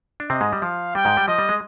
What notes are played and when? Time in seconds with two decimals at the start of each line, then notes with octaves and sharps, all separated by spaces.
0.20 D4
0.30 C3 C4 D#5
0.41 G#2 G#3
0.53 G3
0.62 F3 F5
0.95 G3 G5
1.05 G#2 G#3
1.17 G3
1.28 F3 D#5
1.38 G3
1.49 G#3